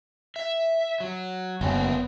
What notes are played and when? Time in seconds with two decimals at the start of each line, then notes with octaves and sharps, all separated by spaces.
0.36 E5
1.00 F#3
1.61 F#1 B3 C4